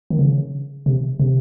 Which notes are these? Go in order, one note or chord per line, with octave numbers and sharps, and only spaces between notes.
D#3
C#3
C3
C3